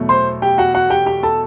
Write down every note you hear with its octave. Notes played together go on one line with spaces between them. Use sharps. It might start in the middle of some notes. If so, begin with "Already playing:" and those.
Already playing: E2 B2 F#3 A3
C5 C6
G4 G5
F#4 F#5
F#4 F#5
G4 G5
G4 G5
A4 A5